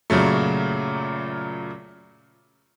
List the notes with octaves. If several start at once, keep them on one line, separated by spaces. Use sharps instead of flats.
F#2 A#2 C#3 F#3 A3